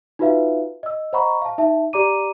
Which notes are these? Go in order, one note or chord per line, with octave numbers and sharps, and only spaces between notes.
D#4 F4 F#4 B4 E5 F5
D#5 E6
C5 D#5 F#5 A#5 B5 C#6
F5 A5
D#4 E5 A5
G4 D5 A#5 D6 D#7